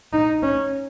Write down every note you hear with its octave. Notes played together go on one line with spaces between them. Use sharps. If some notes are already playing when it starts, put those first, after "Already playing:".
D#4
C#4